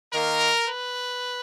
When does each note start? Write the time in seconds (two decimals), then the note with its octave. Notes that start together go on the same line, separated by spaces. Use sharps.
0.12 D#3 A#3 A#4
0.66 B4